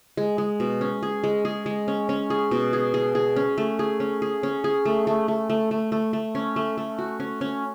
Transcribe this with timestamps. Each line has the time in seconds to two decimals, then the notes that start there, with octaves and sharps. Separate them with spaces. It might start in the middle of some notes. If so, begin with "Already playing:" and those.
0.17 G#3
0.38 G#3
0.60 B2
0.81 C#4
1.03 G#4
1.24 G#3
1.45 G#4
1.66 G#3
1.88 C#4
2.09 C#4
2.30 G#4
2.51 B2
2.73 G#4
2.94 G#4
3.15 G#4
3.36 C#4
3.58 A3
3.79 G#4
4.00 C#4
4.22 G#4
4.43 C#4
4.64 G#4
4.85 A3
5.07 A3
5.28 A3
5.50 A3
5.71 A3
5.92 A3
6.13 A3
6.35 C#4
6.56 A3
6.77 A3
6.99 F#4
7.20 C#4
7.41 C#4